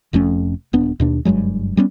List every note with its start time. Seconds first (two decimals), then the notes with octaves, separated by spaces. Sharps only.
0.13 F1 F2 A3 C#4
0.73 D#1 B3 D4
1.00 D#2 B2 D4
1.25 F#1 G2 F#3 G#3
1.77 G3 B3 C#4